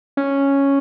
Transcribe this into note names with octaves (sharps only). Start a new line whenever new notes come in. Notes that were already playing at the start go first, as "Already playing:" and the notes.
C#4